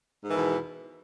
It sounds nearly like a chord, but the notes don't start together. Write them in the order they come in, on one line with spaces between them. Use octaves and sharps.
G#2 D#3 E3 E2 B2